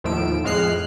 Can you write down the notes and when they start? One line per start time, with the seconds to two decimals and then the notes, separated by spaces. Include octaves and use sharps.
0.04 D#2 A2 F3 E6 D7
0.44 F2 A2 G#3 F6 F#6 C7